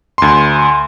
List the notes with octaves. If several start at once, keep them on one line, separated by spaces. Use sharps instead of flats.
D2 C6